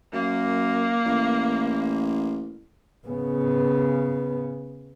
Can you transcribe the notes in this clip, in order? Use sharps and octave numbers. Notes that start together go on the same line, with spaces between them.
F#2 A#3
A1
C#3 B3